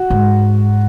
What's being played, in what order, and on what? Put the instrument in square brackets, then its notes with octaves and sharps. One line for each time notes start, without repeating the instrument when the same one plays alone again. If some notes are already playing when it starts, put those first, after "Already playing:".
Already playing: [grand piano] F#4
[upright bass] G#2